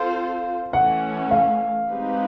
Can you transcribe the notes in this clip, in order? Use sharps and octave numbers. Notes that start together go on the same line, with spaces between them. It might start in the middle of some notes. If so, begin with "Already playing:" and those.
Already playing: C4 F4 A4 C5 F5
E3 A3 C#4 F#5
F5
G#3 C4 D#4 G4 B4